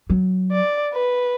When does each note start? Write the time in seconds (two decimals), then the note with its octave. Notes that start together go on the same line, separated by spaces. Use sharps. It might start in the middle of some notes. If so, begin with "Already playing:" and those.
0.10 F#3
0.51 D5
0.93 B4